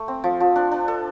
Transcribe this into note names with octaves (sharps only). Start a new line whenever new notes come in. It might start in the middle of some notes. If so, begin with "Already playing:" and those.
Already playing: A3
C4
F3
F3
D4
D4
A4